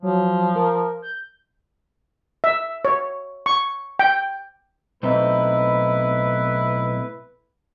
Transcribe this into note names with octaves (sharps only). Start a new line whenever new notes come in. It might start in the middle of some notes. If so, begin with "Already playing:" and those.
F3 F#3
A#4
G6
E5
C#5
C#6
G5
B1 A2 C4 D#4 E4 B4